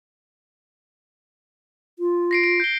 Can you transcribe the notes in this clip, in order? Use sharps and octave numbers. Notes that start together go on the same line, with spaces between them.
F4
A#6 C7 D7
D7
G6 G7